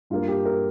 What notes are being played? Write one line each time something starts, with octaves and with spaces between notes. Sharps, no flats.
G2 G3 A#3 F4
G4
A#4